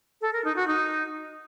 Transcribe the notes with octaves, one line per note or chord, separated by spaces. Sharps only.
A4
A#4
D#4
F#4
D#4